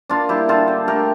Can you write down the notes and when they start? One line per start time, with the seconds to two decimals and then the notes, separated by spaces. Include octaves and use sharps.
0.09 A#3 D4 F4
0.29 G3 E4 G4
0.48 D3 F4 A4
0.68 D3
0.87 A3 G4 A#4